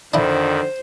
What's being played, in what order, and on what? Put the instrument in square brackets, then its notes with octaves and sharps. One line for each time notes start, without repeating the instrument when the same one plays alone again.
[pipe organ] F2 D#3 [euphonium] D3 [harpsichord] D4 E4 [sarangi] C5